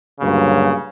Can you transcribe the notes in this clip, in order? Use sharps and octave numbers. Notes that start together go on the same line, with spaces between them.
D2 G2 A#2 C#3 F#3 A#3